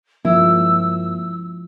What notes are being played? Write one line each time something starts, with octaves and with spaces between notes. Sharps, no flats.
G2 F3 G#3 A#3 C#4 E4 E6